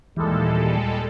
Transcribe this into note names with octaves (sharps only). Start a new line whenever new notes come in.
D#2 A#2 E3 G3 G#3 A4